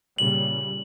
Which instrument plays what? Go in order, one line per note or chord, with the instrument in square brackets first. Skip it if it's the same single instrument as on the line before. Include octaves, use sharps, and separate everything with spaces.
[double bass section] A#2 C#3 G3 [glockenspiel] F#7